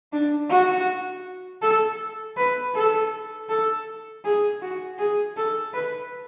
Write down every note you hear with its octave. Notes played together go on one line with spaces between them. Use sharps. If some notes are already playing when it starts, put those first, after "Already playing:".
D4
F#4
A4
B4
A4
A4
G#4
F#4
G#4
A4
B4